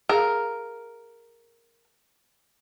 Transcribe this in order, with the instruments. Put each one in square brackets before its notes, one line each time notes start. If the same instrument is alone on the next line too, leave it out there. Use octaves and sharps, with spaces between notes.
[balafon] G#4 F5 [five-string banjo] A#4